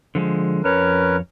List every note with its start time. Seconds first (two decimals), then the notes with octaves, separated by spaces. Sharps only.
0.15 D3 F3 G#3
0.64 F2 C#4 A#4 B4 C#5